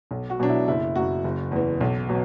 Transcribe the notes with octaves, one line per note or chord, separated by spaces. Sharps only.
B1
F#4
B2 F#3 D4
E4
F#1 E4
F#2 F#3 F#4
F#1
E2 E3
B1
B2 F#3